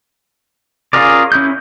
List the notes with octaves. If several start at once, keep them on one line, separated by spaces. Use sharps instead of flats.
C#4 F4 G#4 A#4 D5
C#4 E4 G6